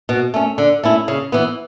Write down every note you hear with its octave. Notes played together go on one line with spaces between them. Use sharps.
B2
A3 C#4
D3
A3 C#4 E4
C#3
E3 B3